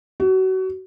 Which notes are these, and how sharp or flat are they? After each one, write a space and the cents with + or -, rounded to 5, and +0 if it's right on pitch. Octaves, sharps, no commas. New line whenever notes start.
F#4 +30